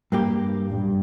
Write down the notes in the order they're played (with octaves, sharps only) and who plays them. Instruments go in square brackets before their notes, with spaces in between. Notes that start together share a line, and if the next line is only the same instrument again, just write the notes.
[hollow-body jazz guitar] G2 A#3 G4
[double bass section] G2